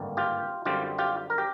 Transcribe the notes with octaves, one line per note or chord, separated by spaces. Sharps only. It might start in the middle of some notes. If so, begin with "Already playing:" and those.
Already playing: G#1 G2 D3 G3 A#3
F4 G4
F#2 D3 G3 C4 F4 G4
F4 G4
A#4
G4